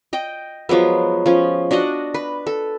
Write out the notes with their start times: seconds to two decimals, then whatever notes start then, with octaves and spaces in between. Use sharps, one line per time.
0.13 D#5 G5
0.69 F3 F#3 G#3 B3
1.26 F3 C#4
1.71 D4 F#4 D#5 F#5
2.14 B4
2.47 A4